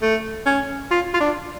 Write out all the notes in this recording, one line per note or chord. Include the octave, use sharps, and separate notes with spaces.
A3
C#4
F4
F4
D4